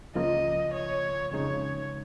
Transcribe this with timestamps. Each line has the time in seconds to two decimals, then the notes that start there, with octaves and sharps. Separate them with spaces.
0.15 C#2 C#3 F3 A#3 F4 D#5
0.73 C#5
1.31 F2 C#3 G#3 D#4 C#5